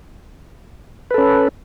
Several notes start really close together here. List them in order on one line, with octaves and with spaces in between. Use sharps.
B4 A4 C#4